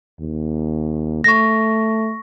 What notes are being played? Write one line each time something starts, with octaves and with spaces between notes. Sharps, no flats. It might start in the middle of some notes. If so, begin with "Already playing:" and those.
D#2
A3 C#6 A#6